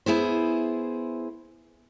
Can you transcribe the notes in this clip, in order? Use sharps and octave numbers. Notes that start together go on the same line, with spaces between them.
B3 E4 G#4 C5